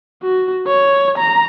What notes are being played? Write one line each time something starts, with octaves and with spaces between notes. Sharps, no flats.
F#4
C#5
A#5